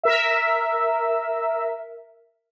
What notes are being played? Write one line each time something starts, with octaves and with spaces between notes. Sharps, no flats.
A#4 E5